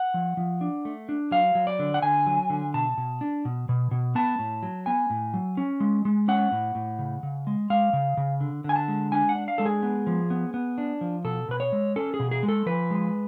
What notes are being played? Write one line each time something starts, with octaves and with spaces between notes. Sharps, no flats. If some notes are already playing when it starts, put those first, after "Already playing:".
Already playing: F#5
F3
F3
D4
A3
D4
F#3 F5
F#3
D5
D3
F#5
D3 G#5
F#3
D3
B2 A5
B2
D4
B2
B2
B2
B3 A5
A2
F#3
B3 G#5
A2
F#3
C#4
G#3
G#3
C#4 F#5
A2
A2
C#3
C#3
G#3
G#3 F5
C#3
C#3
D3
D3 G#5
A5
G#3
D4 G#5
F#5
D4
F5
G#3 A4
G#4
B3
F3
B3
B3
D4
F3
B2 A4
B2 B4
C#5
G#3
C#4 A4
G#4
B2
G#4
G#3
A4
F3 B4
G#3